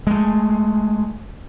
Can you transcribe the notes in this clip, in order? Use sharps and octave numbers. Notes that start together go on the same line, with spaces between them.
G#3 A3